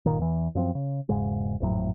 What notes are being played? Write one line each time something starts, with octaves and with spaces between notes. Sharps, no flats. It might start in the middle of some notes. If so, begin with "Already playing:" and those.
G1 A#2 D#3
E2 E3
F#2 F3 B3 C4
C#3
E1 G#2 C#3 G#3
G#1 F2 A2 F#3